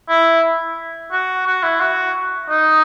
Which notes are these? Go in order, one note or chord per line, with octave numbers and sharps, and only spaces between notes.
E4
F#4
F#4
E4
F#4
D#4